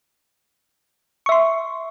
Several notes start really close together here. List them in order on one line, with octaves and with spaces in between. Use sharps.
C#6 E5 C6